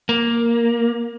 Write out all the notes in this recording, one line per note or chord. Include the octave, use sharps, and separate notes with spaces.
A#3